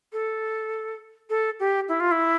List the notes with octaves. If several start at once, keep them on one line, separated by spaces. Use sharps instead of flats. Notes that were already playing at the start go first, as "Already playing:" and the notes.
A4
A4
G4
E4
F4
E4